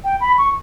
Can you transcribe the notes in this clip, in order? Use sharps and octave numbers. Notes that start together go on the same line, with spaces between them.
G5
B5
C#6